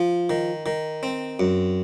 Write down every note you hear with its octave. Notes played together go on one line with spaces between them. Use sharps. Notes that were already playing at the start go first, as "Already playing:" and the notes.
Already playing: F3
D#3
D#3
C4
F#2